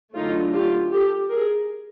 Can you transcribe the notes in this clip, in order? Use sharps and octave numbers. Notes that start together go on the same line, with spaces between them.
D3 F#3 A3 D4 D#4 F4
F4 G4
G4 A4
G#4 A#4